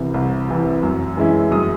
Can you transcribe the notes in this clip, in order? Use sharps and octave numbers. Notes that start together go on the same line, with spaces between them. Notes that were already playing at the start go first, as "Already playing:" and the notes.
Already playing: C2 C3 E3
C2
C3 E3
F#2
E3 G#3 C#4 E4
F#2 D#6